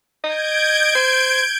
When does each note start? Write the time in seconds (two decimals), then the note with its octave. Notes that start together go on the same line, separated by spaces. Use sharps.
0.24 D#5 G6 G#6 D7
0.95 C5